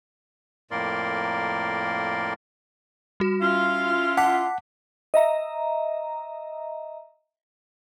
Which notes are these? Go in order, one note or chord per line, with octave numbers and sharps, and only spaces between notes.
F2 A2 A#3 A#4 D5 C6
G3 F#4
C#4 E4 F4 F5
F#5 A5 D6 B6
D#5 E5 A#5